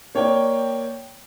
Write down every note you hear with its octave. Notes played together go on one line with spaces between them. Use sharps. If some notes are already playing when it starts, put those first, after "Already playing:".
A#3 C#5 D5 G5